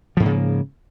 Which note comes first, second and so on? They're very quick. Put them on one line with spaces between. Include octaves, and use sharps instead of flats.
F3 G#2 A#3 C#3